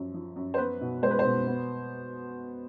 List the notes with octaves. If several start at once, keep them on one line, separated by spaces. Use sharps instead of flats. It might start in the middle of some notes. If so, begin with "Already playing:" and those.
Already playing: F#2 F3
F3
F#2
C5
B3 B4
B2
G#3 C5
B4
C5
B2
B3